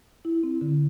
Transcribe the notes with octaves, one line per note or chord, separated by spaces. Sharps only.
E4
C4
D3